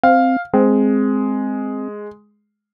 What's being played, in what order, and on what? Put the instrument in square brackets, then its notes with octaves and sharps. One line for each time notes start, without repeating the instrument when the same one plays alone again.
[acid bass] C4 [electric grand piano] F5
[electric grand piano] G#3 [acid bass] C4